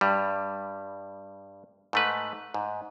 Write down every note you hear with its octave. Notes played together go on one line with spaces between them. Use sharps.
G2 G3
G#2 A3 B4
G#2